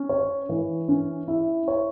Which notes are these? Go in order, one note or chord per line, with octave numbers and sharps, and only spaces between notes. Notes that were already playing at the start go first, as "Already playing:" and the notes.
Already playing: C#4
C#5
E3
C#4
E4
C#5